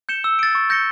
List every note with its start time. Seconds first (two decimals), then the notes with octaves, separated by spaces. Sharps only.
0.09 G6 C#7 E7 G7
0.24 E6
0.39 A6 D7
0.55 C#6
0.70 G6 A#6 C#7 G7